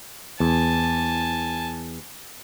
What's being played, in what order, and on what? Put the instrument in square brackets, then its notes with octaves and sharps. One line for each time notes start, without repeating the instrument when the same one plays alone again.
[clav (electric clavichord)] E2 [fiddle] G#5 A5